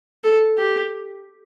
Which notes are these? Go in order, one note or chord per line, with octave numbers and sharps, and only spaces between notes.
A4
G4